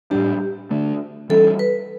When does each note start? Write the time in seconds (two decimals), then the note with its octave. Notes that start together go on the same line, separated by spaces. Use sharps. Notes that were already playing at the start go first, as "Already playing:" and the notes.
0.11 A2 G3 D4 G4
0.71 D3 A3 D4
1.29 E3 G3 C#4 A4
1.59 B4